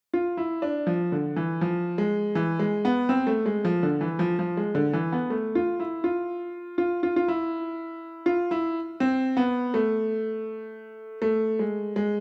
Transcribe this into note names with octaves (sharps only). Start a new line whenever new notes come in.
F4
E4
D4
F3
D3
E3
F3
G#3
E3
G#3
B3
C4
A3
G#3
F3
D3
E3
F3
F3
G#3
D3
E3
B3
A3
F4
E4
F4
F4
F4
F4
E4
F4
E4
C4
B3
A3
A3
G#3
G#3